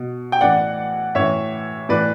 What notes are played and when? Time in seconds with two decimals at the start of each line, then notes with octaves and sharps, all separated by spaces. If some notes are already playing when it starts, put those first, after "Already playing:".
Already playing: B2
0.32 G5
0.41 A2 E3 D5 F#5
1.15 A2 E3 C#5 E5
1.89 A2 E3 B4 D5